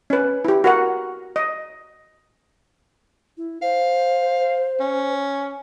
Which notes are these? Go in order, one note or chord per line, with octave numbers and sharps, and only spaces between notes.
C#4 B4
E4 G4
F#4 A#4 F#5
D#5
E4
C5 F5
C#4